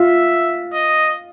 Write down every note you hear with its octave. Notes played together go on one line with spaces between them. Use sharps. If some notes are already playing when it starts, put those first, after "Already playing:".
Already playing: F4 E5
D#5